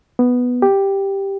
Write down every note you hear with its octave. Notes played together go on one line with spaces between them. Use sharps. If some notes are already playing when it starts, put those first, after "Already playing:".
B3
G4